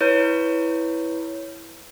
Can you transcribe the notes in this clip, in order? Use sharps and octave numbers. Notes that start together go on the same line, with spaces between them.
E4 B4 C#5 B5 G6